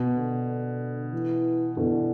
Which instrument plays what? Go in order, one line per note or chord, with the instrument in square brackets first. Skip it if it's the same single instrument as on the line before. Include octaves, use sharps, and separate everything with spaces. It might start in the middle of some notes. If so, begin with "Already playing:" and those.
Already playing: [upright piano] B2
[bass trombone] D3
E3
[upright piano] B2 E3 [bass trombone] D3